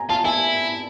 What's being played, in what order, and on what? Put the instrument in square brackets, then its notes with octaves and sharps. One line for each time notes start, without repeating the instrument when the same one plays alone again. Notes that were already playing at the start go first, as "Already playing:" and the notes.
Already playing: [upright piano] G#5 A#5
[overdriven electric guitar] F4 [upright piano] A5
[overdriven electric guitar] E4 [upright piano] G#5